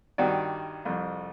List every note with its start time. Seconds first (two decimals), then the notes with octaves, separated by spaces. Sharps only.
0.18 G2 D#3 F#4 D5
0.85 C2 F2